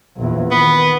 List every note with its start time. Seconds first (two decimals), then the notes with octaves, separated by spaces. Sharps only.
0.17 A#1 E2
0.51 D#3 B3